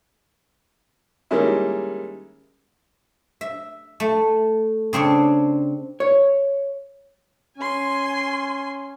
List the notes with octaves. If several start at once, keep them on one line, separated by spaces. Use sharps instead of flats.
D#3 G3 G#3 A#3 C#4 E4
E5
A3
C#3 C4 D4 C#5
C#5
C#4 G#5 C6